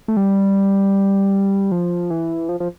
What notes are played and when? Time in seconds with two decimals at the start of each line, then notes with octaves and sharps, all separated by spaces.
0.08 A3
0.17 G3
1.72 F3
2.10 E3
2.49 F3
2.60 F3